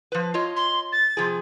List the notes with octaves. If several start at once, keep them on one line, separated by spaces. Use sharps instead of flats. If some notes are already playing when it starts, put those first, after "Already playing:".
F3 B4
F4 C#5 D#5
C6
A6
C3 F3 G#4